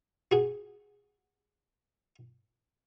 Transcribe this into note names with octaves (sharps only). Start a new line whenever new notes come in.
F#4 G#4